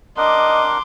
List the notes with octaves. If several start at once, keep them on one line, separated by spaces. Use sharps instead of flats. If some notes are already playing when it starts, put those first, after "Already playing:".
D4 A#4 D#5 F#5 C6 D6